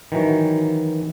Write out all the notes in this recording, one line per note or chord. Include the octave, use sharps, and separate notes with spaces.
D#3 E3 F#3